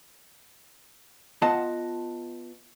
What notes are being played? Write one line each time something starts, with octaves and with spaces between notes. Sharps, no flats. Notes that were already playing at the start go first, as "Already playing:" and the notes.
B3 F4 D#5 F#5 A5